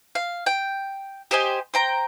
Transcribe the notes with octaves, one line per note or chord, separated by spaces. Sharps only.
F5
G5
G4 C5 D#5 G#5
C5 G5 A#5